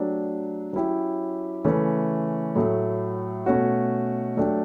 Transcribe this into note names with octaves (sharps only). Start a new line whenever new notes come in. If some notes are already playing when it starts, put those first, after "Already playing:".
Already playing: F#3 A3 D4 G4
F#3 C#4 E4 G4
C#3 E3 A3 C#4
A2 F#3 A3
B2 A3 C#4 F#4
F#3 A3 D4 G4